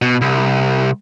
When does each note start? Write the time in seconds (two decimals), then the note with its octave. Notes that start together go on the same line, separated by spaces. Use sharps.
0.02 B2
0.21 C2